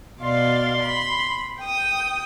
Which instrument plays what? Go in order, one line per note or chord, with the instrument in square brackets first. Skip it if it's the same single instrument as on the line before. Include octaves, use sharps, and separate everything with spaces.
[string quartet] B2 D5 F5 [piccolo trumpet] C6
[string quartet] B5
G5 D#6